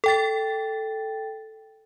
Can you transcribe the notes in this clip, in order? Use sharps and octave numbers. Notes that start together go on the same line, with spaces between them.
A4 G5 A6